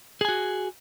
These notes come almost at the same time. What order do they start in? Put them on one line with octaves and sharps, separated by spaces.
G#4 G#5 F#4